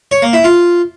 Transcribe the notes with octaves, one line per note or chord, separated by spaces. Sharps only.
C#5
A#3
E4
F4